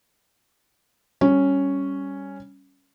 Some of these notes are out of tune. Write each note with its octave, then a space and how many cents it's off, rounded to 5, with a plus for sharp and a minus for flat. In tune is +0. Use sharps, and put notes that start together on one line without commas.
G3 +0 C#4 +0